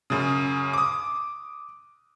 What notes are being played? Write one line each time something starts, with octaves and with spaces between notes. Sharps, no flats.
F#2 C#3
D6 D#6